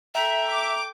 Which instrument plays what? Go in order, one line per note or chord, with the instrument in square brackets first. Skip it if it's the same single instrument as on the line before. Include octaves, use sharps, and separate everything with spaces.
[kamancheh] A4 G5 [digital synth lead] E5 [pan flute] A#5
[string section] D6